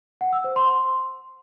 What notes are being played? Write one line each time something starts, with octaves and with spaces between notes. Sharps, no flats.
F#5
E6
C5
C6